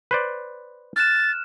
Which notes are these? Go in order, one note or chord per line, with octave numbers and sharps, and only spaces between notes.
B4 C5 D5
F6 F#6 A6 E7